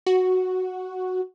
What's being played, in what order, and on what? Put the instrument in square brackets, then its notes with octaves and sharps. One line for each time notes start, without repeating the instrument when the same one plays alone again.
[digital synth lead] F#4